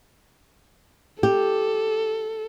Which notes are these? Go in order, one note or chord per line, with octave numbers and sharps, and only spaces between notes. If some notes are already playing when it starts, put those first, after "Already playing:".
G4 A4